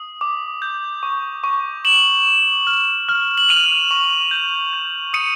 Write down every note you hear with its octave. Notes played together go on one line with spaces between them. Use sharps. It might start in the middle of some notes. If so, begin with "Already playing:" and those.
Already playing: D#6
D6
G6
C#6
C#6
D6 E7 F#7
D6
F6
F6
F#7
F6 D#7 F7
C#6
G6
G6
D#6 C#7 D#7